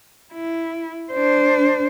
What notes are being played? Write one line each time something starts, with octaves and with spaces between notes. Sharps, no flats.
E4
D4 C5